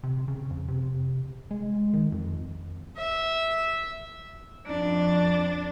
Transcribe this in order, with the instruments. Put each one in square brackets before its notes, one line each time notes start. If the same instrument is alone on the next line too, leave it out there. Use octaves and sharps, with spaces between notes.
[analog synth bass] C3
C#3
F2
C3
G#3
D#3
F2
[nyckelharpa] E5
[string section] F2 [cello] D4